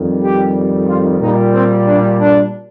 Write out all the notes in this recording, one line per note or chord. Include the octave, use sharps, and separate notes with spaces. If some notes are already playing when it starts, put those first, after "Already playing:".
Already playing: F2 D#3 G3
G4
F4
A#2 G3 D#4
C4
D4
D4